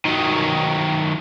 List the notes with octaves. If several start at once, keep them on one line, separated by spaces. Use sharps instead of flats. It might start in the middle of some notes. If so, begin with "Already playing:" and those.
D#3 F#3